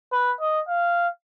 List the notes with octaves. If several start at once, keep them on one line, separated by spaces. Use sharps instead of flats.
B4
D#5
F5